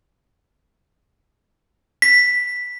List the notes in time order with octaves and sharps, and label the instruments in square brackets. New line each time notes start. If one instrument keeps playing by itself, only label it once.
[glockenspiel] B6